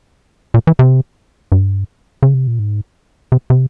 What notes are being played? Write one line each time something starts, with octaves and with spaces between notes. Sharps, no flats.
A#2
E3
C3
G2
C#3
C3
A#2
G#2
C3
C3